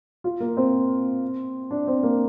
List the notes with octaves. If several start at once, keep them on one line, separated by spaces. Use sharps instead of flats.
F4
A#3
C4
D4
C4
A#3